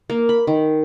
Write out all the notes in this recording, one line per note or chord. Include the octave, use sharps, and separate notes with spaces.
A#3
B5
D#3